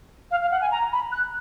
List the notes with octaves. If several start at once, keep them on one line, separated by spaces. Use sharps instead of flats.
F5
F5
F#5
G#5
A#5
B5
F#6